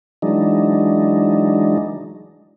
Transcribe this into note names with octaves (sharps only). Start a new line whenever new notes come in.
E3 F#3 G#3 D4 D#4